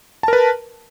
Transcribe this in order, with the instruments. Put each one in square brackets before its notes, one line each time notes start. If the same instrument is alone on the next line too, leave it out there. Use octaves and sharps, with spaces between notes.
[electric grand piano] A5
A#4
B4